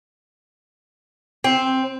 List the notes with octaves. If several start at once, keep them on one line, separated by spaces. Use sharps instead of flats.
C4